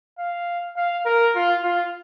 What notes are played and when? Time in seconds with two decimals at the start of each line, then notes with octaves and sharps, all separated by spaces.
0.19 F5
0.76 F5
1.06 A#4
1.35 F4
1.64 F4